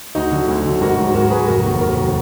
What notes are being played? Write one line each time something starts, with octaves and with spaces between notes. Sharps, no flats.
D2 D#4 F#4
D3 F#3
D2
D3 F#3
G#1 F#4 A#4
G#2 F#3
G#1 F#4 A#4
G#2 F#3 G#4 B4
F1 F#4 A#4
D#2 D#3 F#3
F1 F#4 A#4
D#3 F#3